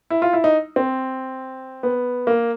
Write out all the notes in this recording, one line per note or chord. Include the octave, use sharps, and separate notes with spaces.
E4
F4
E4
D#4
C4
B3
A#3